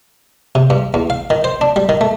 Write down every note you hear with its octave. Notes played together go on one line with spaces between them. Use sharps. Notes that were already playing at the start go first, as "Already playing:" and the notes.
C3
G2
E2
F5
D#3
C5
D4
G3
D#3
A3